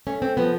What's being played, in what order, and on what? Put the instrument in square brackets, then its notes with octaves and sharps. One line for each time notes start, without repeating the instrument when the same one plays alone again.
[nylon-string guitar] A3 C#4
C4
F3 B3